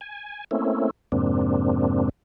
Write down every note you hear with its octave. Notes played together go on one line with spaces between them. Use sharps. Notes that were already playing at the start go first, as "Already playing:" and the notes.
G#5
A3 A#3 C4 C#4 E4
F2 G#2 C3 A#3 C4 D4